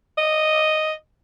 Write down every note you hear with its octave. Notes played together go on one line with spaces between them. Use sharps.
D#5